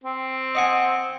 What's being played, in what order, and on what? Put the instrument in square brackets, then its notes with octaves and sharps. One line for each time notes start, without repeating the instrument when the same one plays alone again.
[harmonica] C4
[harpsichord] D#5 F#5 G#5